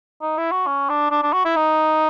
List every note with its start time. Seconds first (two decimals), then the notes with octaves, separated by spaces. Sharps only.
0.22 D#4
0.38 E4
0.52 F#4
0.67 C#4
0.90 D4
1.11 D4
1.23 D4
1.33 F#4
1.45 E4
1.56 D#4